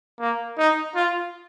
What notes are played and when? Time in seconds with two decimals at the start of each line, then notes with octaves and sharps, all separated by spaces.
0.20 A#3
0.57 D#4
0.95 F4